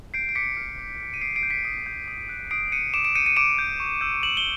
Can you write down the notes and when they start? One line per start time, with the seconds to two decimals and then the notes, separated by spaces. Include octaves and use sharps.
0.14 G6 C7 D7
0.29 D7
0.35 D6 B6 C#7
0.57 F6
0.78 D6
1.00 F6
1.14 D#7
1.21 D#6 C7 D7
1.36 C7 D7
1.43 G6
1.50 B6 C#7
1.64 D#6 C7
1.86 G6
2.08 D#6
2.29 F#6
2.51 D#6 C7 D7
2.72 F#6 C#7 D#7
2.94 D6 D7 E7
3.04 D7 E7
3.15 G6 C#7 D#7
3.26 C#7 D#7
3.37 D6 D7 E7
3.58 G6
3.80 C#6
4.01 E6 G6
4.23 C#6 E7 F#7
4.37 G7